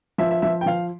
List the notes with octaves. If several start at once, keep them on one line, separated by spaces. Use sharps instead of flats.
F3 E5
E5
F3 E5
G5
F3 F5